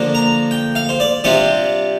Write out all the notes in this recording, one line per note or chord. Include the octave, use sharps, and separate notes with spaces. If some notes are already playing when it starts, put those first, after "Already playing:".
Already playing: D3 F3 A#3 D4
A#5
G5
F5
C5
D5
C3 G3 D4 F4 D5